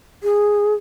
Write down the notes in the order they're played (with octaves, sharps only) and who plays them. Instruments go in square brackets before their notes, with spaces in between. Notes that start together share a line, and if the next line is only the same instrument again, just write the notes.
[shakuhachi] G#4